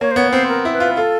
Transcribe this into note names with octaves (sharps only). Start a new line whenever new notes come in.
A#3 C#5
C5
B3 C#5
C4 C5
A#4
E4
B4
F4
F4 A4